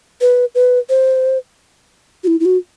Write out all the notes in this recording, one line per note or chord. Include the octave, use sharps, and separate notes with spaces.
B4
B4
C5
F#4
E4
E4
F#4